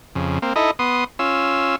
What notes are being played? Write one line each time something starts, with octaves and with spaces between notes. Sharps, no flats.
F2 C#3
A#3 C4
D#4 E4 A4 D#5
B3 C6 D#6
C#4 F4 E6